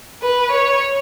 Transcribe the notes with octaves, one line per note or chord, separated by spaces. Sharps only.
B4
C#5